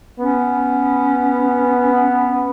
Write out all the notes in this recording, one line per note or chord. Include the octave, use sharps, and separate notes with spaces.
B3 C#4